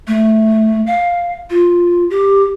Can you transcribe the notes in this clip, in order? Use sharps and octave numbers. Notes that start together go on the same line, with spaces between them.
A3
F5
F4
G4